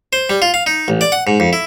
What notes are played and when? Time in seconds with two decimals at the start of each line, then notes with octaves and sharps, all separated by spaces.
0.13 C5
0.30 G3
0.42 F4
0.54 F5
0.66 D#4
0.88 A1
1.01 D5
1.12 F#5
1.27 G#2
1.40 F2
1.53 E4